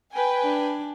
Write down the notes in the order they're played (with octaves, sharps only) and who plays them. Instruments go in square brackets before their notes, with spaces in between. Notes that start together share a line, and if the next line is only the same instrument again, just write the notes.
[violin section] B4 G5 G#5
[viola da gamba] D4